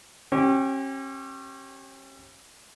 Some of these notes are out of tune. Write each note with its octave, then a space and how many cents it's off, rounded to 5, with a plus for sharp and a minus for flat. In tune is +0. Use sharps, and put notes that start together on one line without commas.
C#4 -40 G4 -15